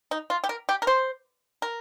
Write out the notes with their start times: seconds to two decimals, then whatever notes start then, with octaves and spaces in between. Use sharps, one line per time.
0.11 D#4
0.30 F4
0.44 G4
0.49 A#4
0.69 G4
0.82 A#4
0.87 C5
1.62 A#4